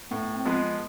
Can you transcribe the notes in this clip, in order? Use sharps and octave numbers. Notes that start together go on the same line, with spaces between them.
A2 B3
C4
F3 G#3 B3